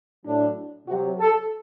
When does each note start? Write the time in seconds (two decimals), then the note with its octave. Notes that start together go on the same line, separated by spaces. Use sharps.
0.24 A2 F#3 D4
0.88 C3 F#3 F#4
1.19 A4